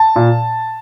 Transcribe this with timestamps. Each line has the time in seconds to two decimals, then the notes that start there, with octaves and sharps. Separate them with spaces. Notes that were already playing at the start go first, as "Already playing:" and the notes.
Already playing: A5
0.16 A#2